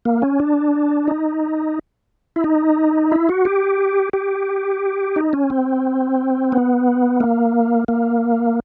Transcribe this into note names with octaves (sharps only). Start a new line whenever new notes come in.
A#3
C#4
D4
D#4
E4
D#4
E4
F#4
G4
G4
D#4
C#4
C4
B3
A#3
A#3